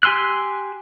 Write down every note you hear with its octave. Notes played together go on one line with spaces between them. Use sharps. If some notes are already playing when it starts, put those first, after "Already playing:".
G4 G#5 C6 E6 F#6